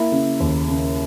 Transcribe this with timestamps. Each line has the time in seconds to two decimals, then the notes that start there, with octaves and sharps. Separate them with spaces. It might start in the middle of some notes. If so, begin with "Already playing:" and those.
Already playing: A#3 E4
0.12 C#3
0.40 D#2
0.68 C#3